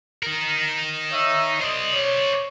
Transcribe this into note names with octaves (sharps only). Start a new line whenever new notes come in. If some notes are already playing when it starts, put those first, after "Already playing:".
D#4 A#4
C#5 D#5 E5
C5 D5 D#5
C#5